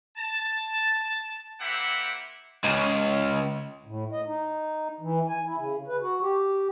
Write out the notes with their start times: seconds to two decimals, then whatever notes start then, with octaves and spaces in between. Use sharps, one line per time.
0.18 A5
1.60 A#3 C4 E4 G4 E5 F#5
2.64 C#2
3.86 A2
4.12 D#5
4.26 D#4
5.00 E3
5.28 G#5
5.46 E4
5.57 C#3
5.88 B4
6.01 F#4
6.21 G4